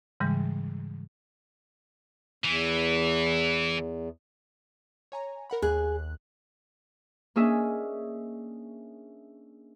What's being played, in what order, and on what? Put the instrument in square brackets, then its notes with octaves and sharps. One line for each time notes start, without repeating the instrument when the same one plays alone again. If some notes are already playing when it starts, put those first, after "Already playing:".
[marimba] G#2 C#3 E3 G3 G#3
[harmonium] E2 [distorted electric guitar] E3
[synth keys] C#5 G#5 A#5
A#4 F#5 B5
[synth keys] D#2 F#6 [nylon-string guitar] G#4
[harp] A#3 C#4 D4 G#4 D#5 E5